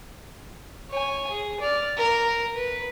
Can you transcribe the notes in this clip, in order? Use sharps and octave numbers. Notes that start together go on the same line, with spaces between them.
C#5 G#5
G#4
D5 F6
A#4
B4